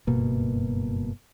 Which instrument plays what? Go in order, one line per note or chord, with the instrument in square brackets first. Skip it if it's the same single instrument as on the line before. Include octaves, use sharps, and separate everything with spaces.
[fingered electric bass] F#1 G2 B2 A#3